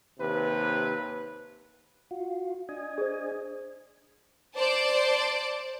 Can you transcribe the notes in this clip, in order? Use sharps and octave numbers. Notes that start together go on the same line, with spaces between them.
D#2 C3 B4
F4 F#4
D4 D#5 G#5
G#4 C5
C5 D5 A5